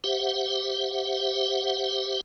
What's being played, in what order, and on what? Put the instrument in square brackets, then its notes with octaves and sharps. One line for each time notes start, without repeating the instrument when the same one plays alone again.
[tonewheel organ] G4 C5 E5 F#5